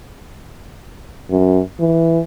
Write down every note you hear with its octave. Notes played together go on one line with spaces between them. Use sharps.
F#2
E3